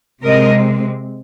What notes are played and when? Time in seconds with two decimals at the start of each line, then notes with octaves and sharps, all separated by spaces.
0.24 C3 G#3 C4 A#4 D#5